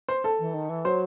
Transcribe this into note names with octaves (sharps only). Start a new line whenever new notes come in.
C5
A4
E3
D#3
E3
F#3 C5